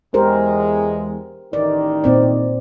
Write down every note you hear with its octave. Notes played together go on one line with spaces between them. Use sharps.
E2 G#3 G4 A#4 C5
A1 D#3 D#4 D5
A#2 C4 D5